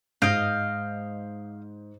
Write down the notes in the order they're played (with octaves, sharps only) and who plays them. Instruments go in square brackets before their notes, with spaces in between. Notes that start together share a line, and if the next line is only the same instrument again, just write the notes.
[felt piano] G#2 G6 D7 [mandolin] D#5 F5